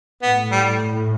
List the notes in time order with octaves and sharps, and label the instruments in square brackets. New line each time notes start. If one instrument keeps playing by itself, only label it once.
[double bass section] A2 [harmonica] B3
[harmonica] G3